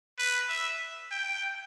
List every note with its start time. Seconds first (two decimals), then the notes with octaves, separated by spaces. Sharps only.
0.19 B4
0.49 E5
1.11 G5